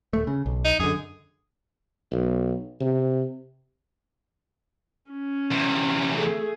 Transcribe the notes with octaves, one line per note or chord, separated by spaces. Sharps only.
D#1 A3
C#3
B1
D#4
F#2 D3 G#4
B1
C3
C#4
E2 C3
A3 G#4